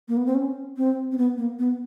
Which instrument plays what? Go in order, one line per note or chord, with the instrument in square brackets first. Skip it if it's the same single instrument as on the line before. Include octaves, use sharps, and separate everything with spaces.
[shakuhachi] A#3
B3
C4
C#4
C4
C4
B3
A#3
B3